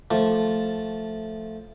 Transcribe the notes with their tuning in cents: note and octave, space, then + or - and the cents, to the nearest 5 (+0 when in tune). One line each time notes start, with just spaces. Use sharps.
F3 +0 A3 +0 A5 +0